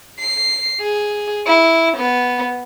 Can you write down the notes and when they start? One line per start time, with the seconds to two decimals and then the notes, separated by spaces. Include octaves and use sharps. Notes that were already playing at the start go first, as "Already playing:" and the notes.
0.19 C7
0.81 G#4
1.47 E4
1.97 B3